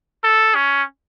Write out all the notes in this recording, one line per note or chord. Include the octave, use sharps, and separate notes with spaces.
A4
C#4